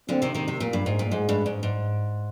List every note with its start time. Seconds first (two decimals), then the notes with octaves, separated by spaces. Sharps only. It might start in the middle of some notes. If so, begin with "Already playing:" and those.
0.09 A#2 D3 C4
0.22 C3 D#3
0.35 C3 D#3
0.48 C3
0.60 A#2 A#3
0.73 G2
0.86 G#2
0.99 A#2
1.12 G#2 G#3
1.29 G2
1.46 G#2
1.63 G#2